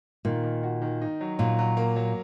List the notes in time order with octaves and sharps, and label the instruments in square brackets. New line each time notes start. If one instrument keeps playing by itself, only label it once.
[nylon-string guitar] A#2 [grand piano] D#3
[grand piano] D#3
F#4
D#3
D#4
F#3
[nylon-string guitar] A#2 [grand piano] F#3
[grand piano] F#3
A#3
F#3